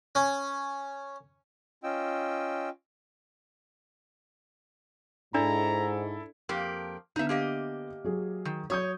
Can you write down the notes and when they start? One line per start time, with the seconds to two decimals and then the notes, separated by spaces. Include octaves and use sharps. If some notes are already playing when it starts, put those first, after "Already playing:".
0.15 C#4
1.83 C#4 F4 D#5 G5 E6
5.34 G#2 D4 E4 A4 D5 A#5
6.49 F2 A#3 G4
7.16 D3 B3 D#4 E5
7.29 A#3 G4 D#5
8.04 F#3 G#4
8.45 D#3
8.70 F#3 C#5 D#6 G6